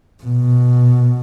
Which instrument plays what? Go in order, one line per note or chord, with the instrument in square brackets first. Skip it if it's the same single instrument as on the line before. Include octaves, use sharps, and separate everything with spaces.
[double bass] B2